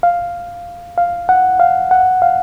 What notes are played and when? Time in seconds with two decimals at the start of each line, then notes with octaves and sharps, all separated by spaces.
0.03 F5
0.98 F5
1.29 F#5
1.60 F5
1.91 F#5
2.22 F5